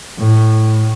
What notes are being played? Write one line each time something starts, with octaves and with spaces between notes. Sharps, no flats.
A2